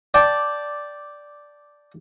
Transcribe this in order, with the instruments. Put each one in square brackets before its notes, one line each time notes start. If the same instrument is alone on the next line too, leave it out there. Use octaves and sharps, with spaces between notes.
[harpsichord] D5 G5 A5